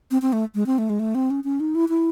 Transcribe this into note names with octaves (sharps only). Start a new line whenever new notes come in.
C4
C4
A3
G#3
C4
A3
G#3
A3
C4
C#4
C#4
D#4
E4
E4